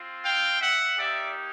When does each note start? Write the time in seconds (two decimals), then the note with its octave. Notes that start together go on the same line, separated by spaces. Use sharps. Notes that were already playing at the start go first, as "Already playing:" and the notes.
Already playing: C4 F4
0.24 F5 G5
0.61 E5 F#5
0.98 A#3 D#4 G4 D5 E5